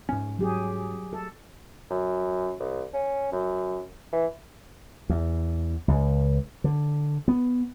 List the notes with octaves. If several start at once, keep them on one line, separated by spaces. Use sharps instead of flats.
G#2 C#4
F#3 G4 G#4
A4
F#2
C2
C#4
F#2
E3
E2
C#2
D3
B3